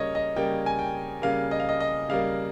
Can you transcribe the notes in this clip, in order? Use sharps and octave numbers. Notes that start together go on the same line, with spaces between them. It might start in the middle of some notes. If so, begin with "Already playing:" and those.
Already playing: C#3 G3 A#3 C#5 D#5
D#5
C#3 G3 A#3 G5
G#5
G5
C#3 G3 A#3 F5
D#5
F5
D#5
D#5
C#3 G3 A#3 F5